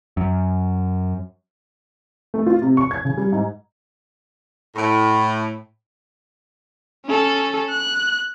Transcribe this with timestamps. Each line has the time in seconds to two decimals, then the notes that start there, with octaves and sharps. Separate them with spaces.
0.17 F#2
2.34 A3
2.46 F4
2.62 C3
2.77 C#6
2.91 G#6
3.05 C#3
3.18 G3
3.32 G#2
4.75 A2
7.05 C#4 A4
7.69 F#6